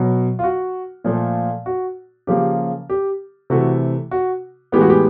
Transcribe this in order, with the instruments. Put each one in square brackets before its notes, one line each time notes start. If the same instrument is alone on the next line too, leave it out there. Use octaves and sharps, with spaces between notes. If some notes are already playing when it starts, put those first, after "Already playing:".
Already playing: [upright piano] B2 F#3
F4
F#4
A#2 F3 A3
F#4
C#3 F3 A#3 G4
G4
C3 E3 A3 F#4
F#4
A2 E3 G#3 B3 G4
F#4
G4